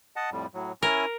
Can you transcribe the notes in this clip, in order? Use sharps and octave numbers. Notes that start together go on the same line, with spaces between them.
D#5 F#5 A5
F2 A2 G3
A2 F#3
C#4 E4 A#4 G#5